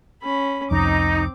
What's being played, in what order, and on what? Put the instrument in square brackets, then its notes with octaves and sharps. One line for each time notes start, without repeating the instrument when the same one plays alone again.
[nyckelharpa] C#4 B5
[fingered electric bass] C2 F2 [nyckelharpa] C4 D6 [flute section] D#4